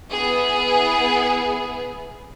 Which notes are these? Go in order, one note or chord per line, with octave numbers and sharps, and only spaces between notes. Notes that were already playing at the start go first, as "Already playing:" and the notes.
B3 E4 G#4